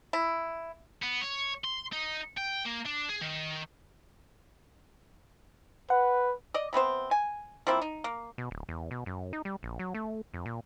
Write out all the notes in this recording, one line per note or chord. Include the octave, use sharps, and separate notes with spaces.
E4
B3
C#5
C6
D#4
G5
A#3
D4
G#4
D#3
B4 F#5
D5 D#5
C3 B3 C4 C5
G#5
F3 A#3 C4 E4
D#4
A#3
B2
D1
E2
B2
F#2
D#4
G3
A#1
F#3
A3
F2
A#2